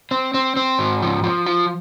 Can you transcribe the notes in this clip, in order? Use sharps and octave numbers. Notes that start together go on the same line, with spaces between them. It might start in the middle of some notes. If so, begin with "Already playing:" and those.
C4
C4
C4
G#2
F3
F3
F4